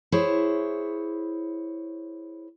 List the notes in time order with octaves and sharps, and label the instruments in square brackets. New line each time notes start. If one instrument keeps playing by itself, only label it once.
[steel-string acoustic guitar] E4 G#4 C5 C#5